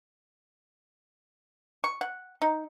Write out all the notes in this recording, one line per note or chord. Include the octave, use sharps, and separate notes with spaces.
C#6
F#5
D#4